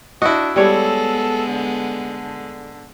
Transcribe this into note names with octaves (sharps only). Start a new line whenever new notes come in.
D4 E4 F#4 D#5
G3 G#3 B3 A4 C#5
D3